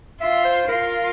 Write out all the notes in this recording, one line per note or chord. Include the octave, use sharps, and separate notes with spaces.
F4 E5
C5
F4 A#4